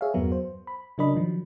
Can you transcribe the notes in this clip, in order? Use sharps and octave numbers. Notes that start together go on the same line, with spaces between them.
G#4 C#5 E5 F5
E2 G2 F#3 B3 A#4
C5
B5
C#3 F#3 D4 A#4 D#5 B5
D#3 F3 F#3